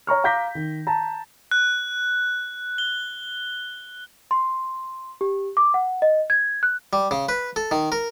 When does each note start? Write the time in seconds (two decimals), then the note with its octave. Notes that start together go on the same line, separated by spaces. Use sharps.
0.07 C#5 A#5 C#6 F6
0.24 F5 A#5 D6 G6 A#6 B6
0.55 D#3
0.87 A5 A#5
1.51 F#6
2.78 G7
4.31 C6
5.21 G4
5.57 D6
5.74 F#5
6.02 D#5
6.30 G#6
6.63 F#6
6.93 G3
7.11 C#3
7.29 B4
7.56 A4
7.71 D#3
7.92 A#4